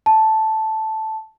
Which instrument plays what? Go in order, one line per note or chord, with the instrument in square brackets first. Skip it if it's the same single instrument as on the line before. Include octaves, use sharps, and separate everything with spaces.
[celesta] A5